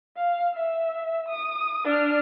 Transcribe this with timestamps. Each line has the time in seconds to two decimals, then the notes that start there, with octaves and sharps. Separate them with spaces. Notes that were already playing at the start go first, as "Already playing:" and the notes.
0.17 F5
0.54 E5
1.28 D#6
1.84 D4 F6